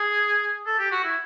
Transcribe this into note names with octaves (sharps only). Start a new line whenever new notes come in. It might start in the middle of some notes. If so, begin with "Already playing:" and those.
Already playing: G#4
A4
G4
F#4
E4